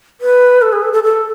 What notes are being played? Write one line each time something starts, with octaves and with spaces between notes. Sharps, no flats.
B4
A4
G#4
A4
A4
A4